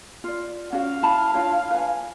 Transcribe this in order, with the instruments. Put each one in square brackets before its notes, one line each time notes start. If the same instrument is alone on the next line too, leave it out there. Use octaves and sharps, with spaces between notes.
[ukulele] F4 D5
[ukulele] C#4 F#4 [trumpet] F5
[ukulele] E4 A5 B5
D4 F4 C#5
B4 G#5